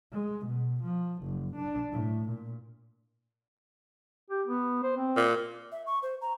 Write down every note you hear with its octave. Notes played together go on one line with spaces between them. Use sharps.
G#3
B2
F3
F#1
D4
A2
A#2
G4
B3
C5
C4
A#2
E5
C#6
C5
A#5